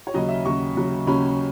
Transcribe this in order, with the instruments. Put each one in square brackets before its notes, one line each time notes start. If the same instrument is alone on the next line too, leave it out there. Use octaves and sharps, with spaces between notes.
[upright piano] C#5
D#2 C#3 F#3 C#4 D#5
E5
D#2 C#3 F#3 C#4 C#6
D#2 C#3 F#3 C#4
D#2 C#3 F#3 C#4 B5